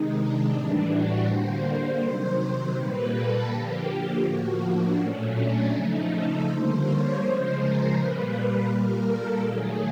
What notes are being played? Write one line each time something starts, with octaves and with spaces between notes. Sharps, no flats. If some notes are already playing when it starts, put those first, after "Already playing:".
Already playing: C3 D#3 G#3 D#4
D4
A2 E3 G3
F#4
D3 G3 A#3 C5
C3 D#3 F#3
A#2 G3 A#3 B4
A4
D3 F3 A#3 G4
A2 F3 A#3 F#4
D4
A#2 F#3 A3 C#4
D4
C#3 F3 A3 D#4
A4
D3 G3 A#3 C5
C#5
C#3 F3 G#3 C5
A#4
A#2 G3 A#3 B4
A#2 G3 A#3 A#4
A4
D#3 F#3 A3 G#4